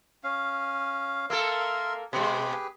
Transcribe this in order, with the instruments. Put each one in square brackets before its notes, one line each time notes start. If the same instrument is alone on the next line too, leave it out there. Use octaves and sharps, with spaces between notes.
[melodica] C#4 F5
[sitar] A#3 A4 [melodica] A#4 E5 C6
[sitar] B2 G#3 [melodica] G4 G#4 B4